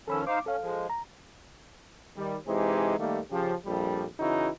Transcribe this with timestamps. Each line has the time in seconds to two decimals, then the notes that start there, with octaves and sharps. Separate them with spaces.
0.08 D#3 F3 C#4 A4 B5 E6
0.27 D#4 C5 F5 D6
0.46 C#4 A4 F5
0.61 F3 G#3
0.90 A#5
2.17 D#3 G3
2.47 C3 E3 G#3 D#4 G4 C5
2.99 D#3 G3 A3 A#3
3.31 C#3 F3 G4
3.65 A#1 F2 G3
4.19 C#3 E3 D#4 E4 F#4